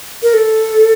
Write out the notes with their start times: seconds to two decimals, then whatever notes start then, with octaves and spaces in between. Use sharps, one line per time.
0.23 A#4
0.34 A4